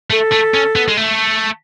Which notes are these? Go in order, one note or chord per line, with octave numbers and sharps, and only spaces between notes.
A3 A4
A3
C#4
B3
G#3
A3